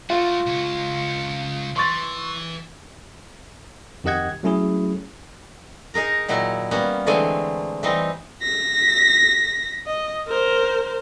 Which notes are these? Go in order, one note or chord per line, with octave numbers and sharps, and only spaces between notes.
A3 F4 F#4
C#2 C#4
E3 C6 C#6 A6
F2 D#3 G4 D#5 F#5 G#6
F#3 A3 C#4 E4 G#4
D#4 G#4 A#4 A#5
A#2 D#3 F#3 E4
G3 A#3 B3 C#4
D3 E3 G#3 A3 C4 G#5
E3 G3 C4 D#4
A#6 B6
D#5
A#4 C5